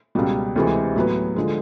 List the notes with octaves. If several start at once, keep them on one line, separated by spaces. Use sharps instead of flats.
C#2 B2 G3
D2 C3 E3 G#3
A2 F#3 B3
D3 F3 G#3